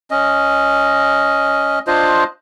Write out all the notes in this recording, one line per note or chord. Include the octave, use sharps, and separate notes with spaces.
C#4 D#5
D4 F4 C5 D#5